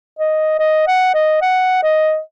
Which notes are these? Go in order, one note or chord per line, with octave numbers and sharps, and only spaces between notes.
D#5
D#5
F#5
D#5
F#5
D#5